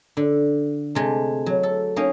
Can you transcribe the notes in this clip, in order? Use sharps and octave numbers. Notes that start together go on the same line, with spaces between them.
D3
C3 G#3 A3
F#3
A4
A#3 C#4 D#4